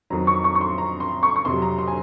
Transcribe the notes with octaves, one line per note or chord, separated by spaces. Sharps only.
F2 D#3 F#3 A#5
C#6
C#6
C#6
C6
A#5
C6
C#6
C#6
F2 C3 F#3 C6
A#5
C6
G#5